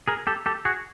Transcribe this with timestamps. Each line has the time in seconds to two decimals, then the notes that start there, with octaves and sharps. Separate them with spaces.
0.08 G#4 A#4
0.27 G4 A4
0.46 G4 A4
0.65 F#4 G#4